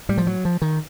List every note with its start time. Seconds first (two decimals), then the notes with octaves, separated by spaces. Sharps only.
0.09 A2 G3
0.18 F3
0.27 F#3
0.45 F3
0.62 D#3